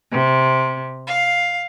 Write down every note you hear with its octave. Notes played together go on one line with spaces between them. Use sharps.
C3
F5